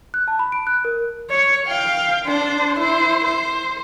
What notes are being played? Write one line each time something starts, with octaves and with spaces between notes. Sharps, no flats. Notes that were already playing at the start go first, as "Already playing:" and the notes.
F#6
A5
B5
D7
F#6
A#4
C#5
F5 G5
D4 C5
E4 C5
C5